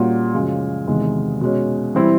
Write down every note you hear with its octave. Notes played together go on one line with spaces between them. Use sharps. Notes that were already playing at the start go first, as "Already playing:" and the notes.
Already playing: A#2 G3 A#3 C#4 F#4
F#2 C#3 F3 G#3
E2 C3 D#3 G#3
B2 G#3 C#4
E3 G3 C4 E4